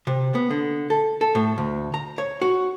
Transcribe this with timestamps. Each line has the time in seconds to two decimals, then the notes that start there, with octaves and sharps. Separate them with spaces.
0.07 C3
0.35 B3
0.51 D3
0.90 A4
1.21 A4
1.35 A2
1.58 D2
1.94 A#5
2.18 C#5
2.42 F#4